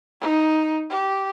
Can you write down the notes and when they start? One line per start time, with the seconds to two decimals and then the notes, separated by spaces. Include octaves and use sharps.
0.21 D#4
0.90 G4